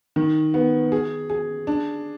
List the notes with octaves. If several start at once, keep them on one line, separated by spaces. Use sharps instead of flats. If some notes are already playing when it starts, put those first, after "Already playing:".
D#3
B3
G#4
G#4
D4